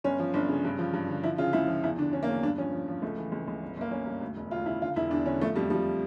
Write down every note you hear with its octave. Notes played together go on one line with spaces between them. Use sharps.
G1 C#4
F3
G1 D4
C#3
G2
F3
G2
D3
F3 E4
C#3 F4
C#2 E4
F3
E2 E4
D3 D4
D3 C#4
A#3
E2 C#4
G2 D4
F3 C#4
F3
F3
C#2 A3
E3
C#2
C#2
G1
G1 A#3
G1 C#4
G2
D2
E1
D2 F4
C#3 E4
D3 F4
E1 E4
E2 D4
D3 C#4
F3 A3
F2 G3
F3 G3